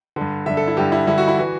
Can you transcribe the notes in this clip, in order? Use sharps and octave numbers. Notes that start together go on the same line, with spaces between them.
G2 D3
G2 D3 E5
A4
E4
G2 D3 G4
E4
G2 D3 E4
F#4
E4
E3 F#4